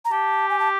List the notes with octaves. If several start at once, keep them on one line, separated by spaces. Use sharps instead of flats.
A#5
G4 A5
G#5
A5